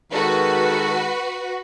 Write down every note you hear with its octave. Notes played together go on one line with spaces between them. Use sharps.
D#3 G#3 F#4 A4 B4